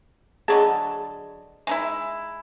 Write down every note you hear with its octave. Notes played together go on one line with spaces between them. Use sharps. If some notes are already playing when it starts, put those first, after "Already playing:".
D3 F#3 G#4 B4 D#5 A5
G#3 D#4 E4